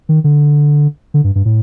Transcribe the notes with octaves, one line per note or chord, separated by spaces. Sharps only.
D#3
D3
D3
G2
G2
A2